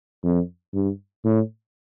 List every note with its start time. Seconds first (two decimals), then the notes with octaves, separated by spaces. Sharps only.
0.24 F2
0.74 G2
1.25 A2